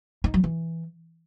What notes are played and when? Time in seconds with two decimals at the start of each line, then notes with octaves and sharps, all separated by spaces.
0.24 D#4
0.34 F#3
0.44 E3